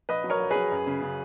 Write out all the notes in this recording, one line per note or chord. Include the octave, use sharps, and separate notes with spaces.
A#1 B4 D#5
F#3
A#4 C#5
A#1
F#3 G#4 B4
F#2
C#3
C#3